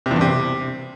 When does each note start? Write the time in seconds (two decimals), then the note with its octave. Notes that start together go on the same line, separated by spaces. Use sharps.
0.06 C3
0.11 E2
0.16 G2
0.21 C3